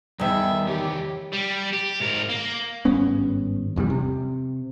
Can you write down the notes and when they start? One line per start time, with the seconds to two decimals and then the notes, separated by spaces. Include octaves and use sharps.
0.20 E2 D#3 G3 E5
0.68 E3 G4 C#5 D5
1.33 G3
1.73 G4
2.00 G#2 A#4
2.30 A#3
2.85 G#1 G2 B3 C#4
3.76 F1 E2 C3 G3
3.90 C3